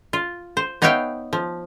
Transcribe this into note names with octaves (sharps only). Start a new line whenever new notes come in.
F4
C5
B3 D#4 C#5 E5 F5 G5
F3